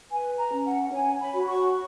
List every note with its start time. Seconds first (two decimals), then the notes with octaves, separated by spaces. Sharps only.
0.10 B4 G#5
0.38 A#5
0.51 C#4
0.65 F#5
0.92 C#5 G#5
1.20 B5
1.33 F#4
1.47 C#6